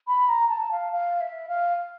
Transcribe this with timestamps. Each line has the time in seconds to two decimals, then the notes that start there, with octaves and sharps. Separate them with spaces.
0.07 B5
0.29 A#5
0.49 A5
0.71 F5
0.93 F5
1.21 E5
1.48 F5